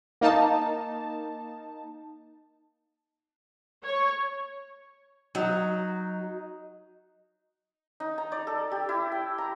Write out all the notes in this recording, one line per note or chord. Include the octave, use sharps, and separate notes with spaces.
A#3 D#4 A5
C#5
F#3 D#4
D#4
A#5
D5
A4
G4
E4
G5
A#5